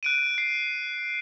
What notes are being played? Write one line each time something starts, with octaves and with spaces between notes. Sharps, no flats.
F#6 D7 D#7
C7